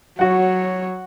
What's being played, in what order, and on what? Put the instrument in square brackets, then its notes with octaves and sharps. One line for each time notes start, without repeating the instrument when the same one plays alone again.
[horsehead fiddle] F#3 C#5 [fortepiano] F#4 F#5